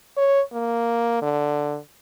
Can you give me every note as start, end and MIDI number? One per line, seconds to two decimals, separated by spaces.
0.17 0.41 73
0.53 1.19 58
1.22 1.77 50